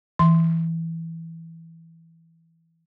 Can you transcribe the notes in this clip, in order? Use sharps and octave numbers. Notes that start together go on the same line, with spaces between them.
E3 C6